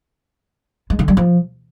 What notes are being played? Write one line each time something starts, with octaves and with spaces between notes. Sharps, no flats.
G#3
D3
G3
F3